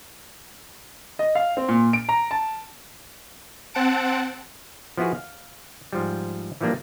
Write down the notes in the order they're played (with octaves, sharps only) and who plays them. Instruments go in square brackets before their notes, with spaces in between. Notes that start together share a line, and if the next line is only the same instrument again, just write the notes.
[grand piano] D#5
F5
C4
A#2
D7
A#5
A5
[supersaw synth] C4 F#5 A5 D7
[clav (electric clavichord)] F3 B3 E4 F#4 G#4
F5
G#2 F3 G3
E3 F3 G3 A#3 D4